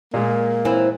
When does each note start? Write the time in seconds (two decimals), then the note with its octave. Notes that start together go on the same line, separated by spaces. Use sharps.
0.14 A#2 G#3 A#3
0.65 E3 C4 E4